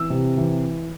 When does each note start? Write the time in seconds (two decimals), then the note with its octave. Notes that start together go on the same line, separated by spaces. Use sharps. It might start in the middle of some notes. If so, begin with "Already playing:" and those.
Already playing: E3 E6
0.10 C3
0.37 E3